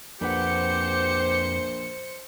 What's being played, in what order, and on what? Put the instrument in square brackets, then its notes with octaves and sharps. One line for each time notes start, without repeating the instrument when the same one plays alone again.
[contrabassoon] A#1 [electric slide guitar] F2 B4 F#5 [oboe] G4 [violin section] C5 C#7